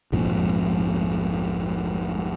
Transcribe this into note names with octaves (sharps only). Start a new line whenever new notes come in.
A#1 F2 G#2 F3